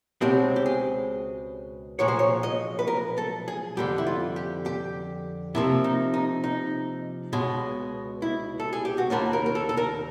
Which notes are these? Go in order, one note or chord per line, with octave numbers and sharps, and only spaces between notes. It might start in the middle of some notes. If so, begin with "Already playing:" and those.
C#2 B2 G#3 C4 G4
G4
G#4
B1 A#2 F3 G#3 C#5
C5
C#5
D#5
B4
A#4
A4
G#4
F2 D3 G3 G4
E4
F4
G4
G4
C3 F3 A#3 E4
D#4
D#4
D#4
C#2 B2 G#3
E4
A4
G#4
G4
F#4
D#2 D#3 G3 A#3 D4 F4
A#4
A#4
A4
A4
A#4